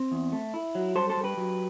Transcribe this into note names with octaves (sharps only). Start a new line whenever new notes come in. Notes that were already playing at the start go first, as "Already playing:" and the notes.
Already playing: C4
E2
A3
E4
F#3
G3 A4 C5
A4 C5
G3
G4 B4
F#3